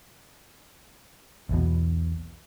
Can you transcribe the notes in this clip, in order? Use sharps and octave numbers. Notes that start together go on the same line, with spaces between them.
B1 E2 B2